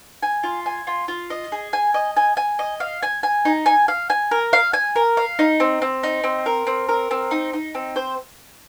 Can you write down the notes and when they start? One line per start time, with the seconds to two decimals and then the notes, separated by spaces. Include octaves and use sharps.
0.22 G#5
0.43 F4
0.66 G#5
0.87 F4
1.08 F4
1.30 D#5
1.52 G#4
1.73 G#5
1.94 D#5
2.17 G#5
2.37 G#5
2.59 D#5
2.80 F5
3.03 G#5
3.23 G#5
3.45 D#4
3.66 G#5
3.88 F5
4.10 G#5
4.31 A#4
4.53 F5
4.73 G#5
4.96 A#4
5.17 F5
5.39 D#4
5.60 C4
5.82 C4
6.03 D#4
6.24 C4
6.46 A#4
6.67 C4
6.89 A#4
7.11 C4
7.31 D#4
7.53 D#4
7.75 C4
7.96 C5